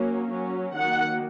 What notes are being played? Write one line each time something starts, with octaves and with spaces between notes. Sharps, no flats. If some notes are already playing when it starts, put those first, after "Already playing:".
Already playing: F#3 A#3 C#4
F#3 C#4
D#3 F#3 A#3 F#5